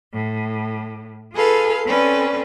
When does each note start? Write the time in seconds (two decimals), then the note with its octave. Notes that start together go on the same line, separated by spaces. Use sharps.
0.14 A2
1.34 F4 G#4 A4 B4 F5
1.86 C4 C#4 A4 B4 D5